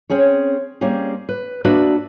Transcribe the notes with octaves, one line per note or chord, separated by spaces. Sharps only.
C4 C#4 G#4 C#5
G3 A#3 C4 C#4 G#4
B4
A#3 D4 F#4 B4 D5 E5